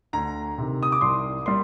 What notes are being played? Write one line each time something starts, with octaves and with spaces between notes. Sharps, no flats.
D2 A#5
C3 D#3
D#6
D6
C2 C6
G3 A#3 C6